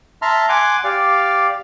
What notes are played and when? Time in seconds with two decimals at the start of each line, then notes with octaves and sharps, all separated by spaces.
0.22 E5 A5 A#5 C6 F6
0.49 F#5 G#5 C6 D6
0.84 G4 D5 F5